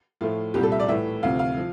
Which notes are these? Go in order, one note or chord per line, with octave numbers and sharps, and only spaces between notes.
A2 F3 A3 F4
C2 A#2 G3 G4
A4
E5
D5
A2 E3 A3 E5
D2 C3 F3 F5
F5
F3